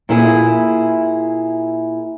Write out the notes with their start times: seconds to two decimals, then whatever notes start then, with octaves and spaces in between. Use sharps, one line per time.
0.09 A#2 E4 G#4